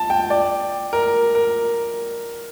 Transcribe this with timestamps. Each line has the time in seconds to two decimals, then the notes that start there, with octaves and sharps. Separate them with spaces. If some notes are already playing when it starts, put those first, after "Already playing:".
Already playing: A5
0.10 G5
0.30 D5
0.93 A#4
1.35 A#4